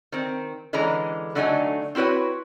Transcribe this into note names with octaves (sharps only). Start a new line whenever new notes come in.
D#3 C4
D3 E3 G#3 C#4 A#5
D3 F#3 A3 D4 D#4 G#5
C4 E4 F#4 B4 C#5